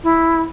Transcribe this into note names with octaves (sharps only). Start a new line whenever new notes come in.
E4